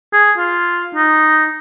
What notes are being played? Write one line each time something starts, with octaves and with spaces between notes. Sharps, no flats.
G#4
F4
D#4